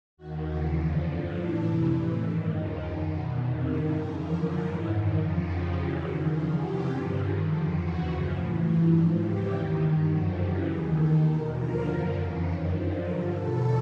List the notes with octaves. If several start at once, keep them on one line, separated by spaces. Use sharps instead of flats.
D#2 D#3 F#4
D#2 C#3 E3 F#4
F2 D3 F3 F4
G2 D3 F3 D4
A2 E3 D4
F2 C3 E3
A2 E3
G2 D#3 D4
D#2 C#3 F3 D#4
F#2 D#3 G4
E2 B2 F#4
F2 C3 D#3
G2 D#3 E4
F2 C#3 E3 A#4
F#2 D3 F3 A#4
G#2 E3 A#4
F#2 D#3
F2 C#3 F3
F2 C#3 F3 F#4
E2 C#3 E3 G4
F#2 D#3 F#4
E2 C#3 F3 F4
E2 C3 E3 G4
G2 D3 F3
G2 D#3 G#4
F2 D3 F3 A4
D#2 C#3 E3 F#4
F#2 C#3 F3
A2 E3
G2 E3 F4
G#2 F3 D4
E2 C#3 E3 G4
D#2 D#3
G2 D#3
F#2 D3 F3 F#4
F#2 C#3 E3 G4
D#2 D#3 G#4
D#2 D#3 A4
E2 B2 A#4
D#2 D3 F3 A#4
F#2 D3 F3
F2 C#3 E3
F#2 D#3 C#5
F#2 D3 F3 C5
G2 D3 F3 A#4
E2 B2 A4